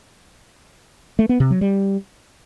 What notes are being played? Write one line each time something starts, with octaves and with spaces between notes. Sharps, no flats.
A3
B3
C3
F#3
G3